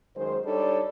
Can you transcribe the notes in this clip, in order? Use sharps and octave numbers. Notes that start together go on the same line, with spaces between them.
F#2 D#3 G#3 C5
G3 D4 D#4 A4 C#5 D5